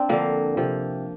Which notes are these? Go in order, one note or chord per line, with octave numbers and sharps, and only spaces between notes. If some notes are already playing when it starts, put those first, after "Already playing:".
Already playing: C4 D4
D3 F3 A#3
C3 F3